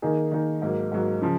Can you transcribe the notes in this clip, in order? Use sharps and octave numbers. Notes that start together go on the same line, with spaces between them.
D#3 A#3 D#4 G#4
D#3 A#3 D#4 G#4
G#2 F#3 A#3
G#2 F#3 A#3
C#3 F3